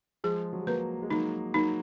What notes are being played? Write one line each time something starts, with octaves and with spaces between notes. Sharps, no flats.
F3 G#3 G#4
F#3
G#3
F#3 A#3 B4
G#3
F#3 A#3 D#4
F#3 A#3 D#4